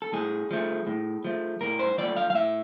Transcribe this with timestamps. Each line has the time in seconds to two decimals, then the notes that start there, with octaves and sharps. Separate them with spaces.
0.02 A4
0.13 A2 G#4
0.51 F3 A3
0.87 A2
1.24 F3 A3
1.61 A2 A#4
1.79 C5
1.98 F3 A3 D5
2.16 F5
2.30 F5
2.35 A2 E5